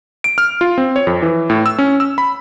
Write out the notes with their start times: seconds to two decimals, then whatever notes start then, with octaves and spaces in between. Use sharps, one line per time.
0.24 D7
0.38 F6
0.61 F4
0.78 C4
0.96 C#5
1.07 F2
1.22 E3
1.50 A2
1.66 E6
1.78 C#4
2.00 E6
2.18 B5